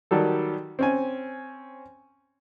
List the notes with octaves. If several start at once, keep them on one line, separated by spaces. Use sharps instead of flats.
D#3 F#3 G3 A4
C4 C#4 G#5